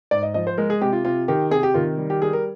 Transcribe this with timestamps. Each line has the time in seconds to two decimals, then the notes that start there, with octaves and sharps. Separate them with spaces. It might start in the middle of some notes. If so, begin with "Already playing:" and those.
0.11 G#2 D5
0.23 D#5
0.34 F3 D#5
0.47 C5
0.58 G#3 A#4
0.70 G#4
0.81 C3 G4
0.93 F4
1.05 C3 F4
1.28 D#3 G4
1.51 C3 G#4
1.63 G4
1.74 D#3 F4
1.98 G3
2.10 G4
2.22 G3 G#4
2.33 A#4